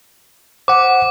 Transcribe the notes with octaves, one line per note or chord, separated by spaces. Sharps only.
C5 F#5 D6